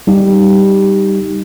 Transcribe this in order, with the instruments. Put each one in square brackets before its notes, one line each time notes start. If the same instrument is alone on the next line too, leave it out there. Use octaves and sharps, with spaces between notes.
[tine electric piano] G3 D#4 G4